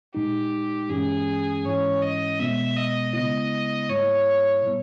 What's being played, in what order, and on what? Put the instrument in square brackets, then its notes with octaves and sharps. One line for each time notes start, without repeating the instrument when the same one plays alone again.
[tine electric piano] A#2 G#3 D#4 [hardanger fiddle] G4
[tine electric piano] G2 E3 G#3 C#4 [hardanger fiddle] G#4
[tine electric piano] G#2 E3 G#3 C#4 E4 [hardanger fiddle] C#5
[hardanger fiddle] D#5
[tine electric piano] B2 G#3 B3 [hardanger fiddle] E5
[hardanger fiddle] D#5
[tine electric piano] C#3 G#3 B3 E4 [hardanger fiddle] D#5
[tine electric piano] G#2 G3 A#3 E4 [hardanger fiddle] C#5
[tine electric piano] A#2 G3 B3